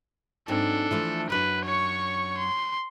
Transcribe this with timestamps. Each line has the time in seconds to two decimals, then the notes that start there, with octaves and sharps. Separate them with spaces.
0.48 G#2 F#3 C4 D4 A4
0.91 E3 F3 A3
1.30 F#2 F#3 D4 B4
1.65 C#5 C#6
2.37 C6